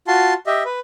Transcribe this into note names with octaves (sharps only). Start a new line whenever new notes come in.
F4 F#4 A5 C6
G4 D#5 E5
B4